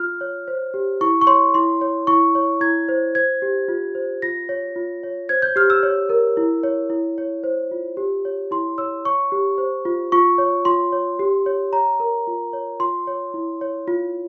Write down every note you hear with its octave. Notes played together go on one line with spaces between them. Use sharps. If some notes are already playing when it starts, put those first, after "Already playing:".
Already playing: F4 F6
C#5
C5
G4
E4 C#6
C#6
C#5 C6
E4 C6
C#5
E4 C#6
C#5
E4 G#6
C5
C5 G#6
G4
F4
C5
F4 A#6
C#5
F4
C#5
C5 G#6
G6
G4 F6
E6
C#5
A#4
E4
C#5
E4
C#5
C5
F4
G4
C#5
E4 C6
C#5 E6
C#5 C#6
G4
C5
F4
F4 C#6
C#5
F4 C6
C#5
G4
C#5
C#5 A#5
A#4
F4
C#5
F4 C6
C#5
E4
C#5
F4